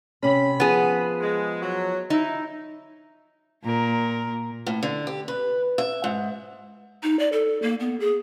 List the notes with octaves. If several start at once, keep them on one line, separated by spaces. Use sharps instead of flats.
C3 C#4 B5
F3 B3 G#4
G#3
F#3
D#4 E4
A#2 A#4
A2
D3
G4
B4
E5
G#2
D#4
D5
A4
A#3
B3
G#4